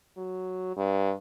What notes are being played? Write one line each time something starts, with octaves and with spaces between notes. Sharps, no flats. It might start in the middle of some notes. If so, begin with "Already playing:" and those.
F#3
G2